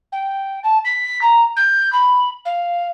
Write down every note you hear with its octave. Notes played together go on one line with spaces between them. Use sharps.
G5
A5
B6
A#5
G6
B5
F5